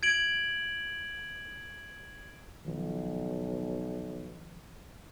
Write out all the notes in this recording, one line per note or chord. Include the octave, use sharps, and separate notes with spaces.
G#6 D7 F#7
B1 D#3 F3